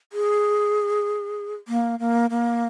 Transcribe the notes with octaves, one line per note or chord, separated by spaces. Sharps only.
G#4
A#3
A#3
A#3